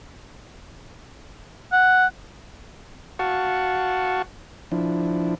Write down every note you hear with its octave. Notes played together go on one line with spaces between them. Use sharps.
F#5
F#4 F5 F#5 A5 C#6
F3 D4 E4